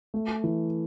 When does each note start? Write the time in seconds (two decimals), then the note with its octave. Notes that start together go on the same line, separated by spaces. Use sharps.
0.14 A3
0.44 E3